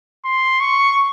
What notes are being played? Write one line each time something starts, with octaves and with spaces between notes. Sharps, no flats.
C6
C#6